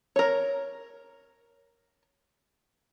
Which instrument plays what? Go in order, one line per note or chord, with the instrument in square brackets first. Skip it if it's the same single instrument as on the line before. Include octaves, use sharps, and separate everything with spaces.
[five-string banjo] A#4 C#5